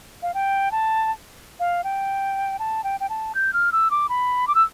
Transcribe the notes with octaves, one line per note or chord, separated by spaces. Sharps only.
F5
G5
A5
F5
G5
A5
G5
G5
A5
G6
F6
E6
D6
B5
D6
E6